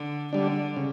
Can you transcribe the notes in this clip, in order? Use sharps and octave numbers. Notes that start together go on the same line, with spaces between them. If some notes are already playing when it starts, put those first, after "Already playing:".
Already playing: D3
D3 G3 D4
C#3